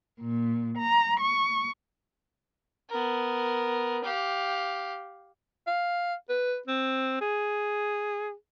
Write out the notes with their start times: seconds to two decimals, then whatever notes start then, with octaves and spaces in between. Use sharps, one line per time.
0.20 A#2
0.78 A#5
1.19 C#6
2.90 B3 A#4
4.04 G4 F5
5.67 F5
6.29 B4
6.68 C4
7.21 G#4